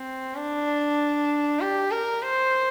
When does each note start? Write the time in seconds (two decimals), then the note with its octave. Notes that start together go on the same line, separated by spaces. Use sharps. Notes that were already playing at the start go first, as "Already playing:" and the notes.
Already playing: C4
0.35 D4
1.60 G4
1.91 A#4
2.22 C5